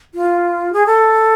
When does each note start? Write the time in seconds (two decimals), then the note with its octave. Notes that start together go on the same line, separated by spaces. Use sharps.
0.15 F4
0.73 G#4
0.86 A4